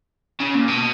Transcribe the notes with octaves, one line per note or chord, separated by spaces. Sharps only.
C#3
A#2
B2